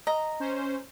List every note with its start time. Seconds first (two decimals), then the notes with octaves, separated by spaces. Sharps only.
0.07 D#5 A#5
0.40 C#4 C5